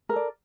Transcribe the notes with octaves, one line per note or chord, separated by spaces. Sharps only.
A4 A#4 D5